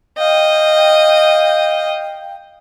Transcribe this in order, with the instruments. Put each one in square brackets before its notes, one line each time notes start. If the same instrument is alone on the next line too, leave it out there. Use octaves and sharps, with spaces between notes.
[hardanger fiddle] D#5 [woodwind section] F5 G5